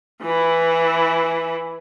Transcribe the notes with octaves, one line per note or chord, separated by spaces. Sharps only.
E3 E4